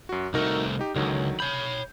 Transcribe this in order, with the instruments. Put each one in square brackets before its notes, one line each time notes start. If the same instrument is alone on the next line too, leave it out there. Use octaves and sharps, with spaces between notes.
[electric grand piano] F#2 F#4
[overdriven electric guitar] C2 A3 [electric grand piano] D#4 F#4 A#4
[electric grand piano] D#4 G4
[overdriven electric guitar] C#2 [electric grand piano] D3 D#3 F#3
[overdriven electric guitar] C#5 B5 [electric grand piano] G6